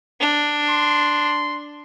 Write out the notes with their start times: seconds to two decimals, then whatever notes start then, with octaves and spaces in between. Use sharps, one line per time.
0.20 D4
0.71 C6